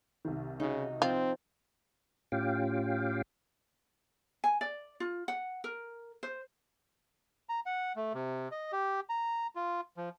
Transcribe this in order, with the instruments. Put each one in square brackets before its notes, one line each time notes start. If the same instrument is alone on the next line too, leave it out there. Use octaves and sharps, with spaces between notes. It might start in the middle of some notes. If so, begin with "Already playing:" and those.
[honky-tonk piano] C2 D#3
[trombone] C#3 [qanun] D#4 F#4
[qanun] F3 [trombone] C4 [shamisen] F4
[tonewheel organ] A2 C#4 F4 G4 F5 G5
[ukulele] G#5
D5
F4
F#5
A#4
C5
[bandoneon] A#5
F#5
A3
C3
D#5
G4
A#5
F4
F3